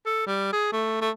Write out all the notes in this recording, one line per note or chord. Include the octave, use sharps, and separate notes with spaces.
A4
G3
G#4
A3
A3